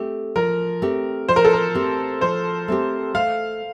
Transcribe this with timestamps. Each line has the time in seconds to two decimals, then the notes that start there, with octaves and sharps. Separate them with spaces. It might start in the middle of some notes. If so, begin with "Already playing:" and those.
Already playing: A3 C4 G4
0.36 F3 A#4
0.82 A3 C4 G4
1.28 F3 C5
1.36 A#4
1.45 A4
1.53 A#4
1.75 A3 C4 G4
2.21 F3 C5
2.68 A3 C4 G4
3.14 A3 F5